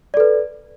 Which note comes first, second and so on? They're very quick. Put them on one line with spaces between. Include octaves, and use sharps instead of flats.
D5 A4 B4